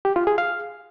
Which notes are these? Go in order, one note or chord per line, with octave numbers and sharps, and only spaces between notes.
G4
F4
G#4
F5